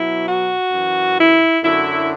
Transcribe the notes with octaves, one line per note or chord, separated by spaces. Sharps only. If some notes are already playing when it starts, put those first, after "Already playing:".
Already playing: B2 F#3 E4
F#4
F#2 E3
E4
F#2 D3 F#3 E4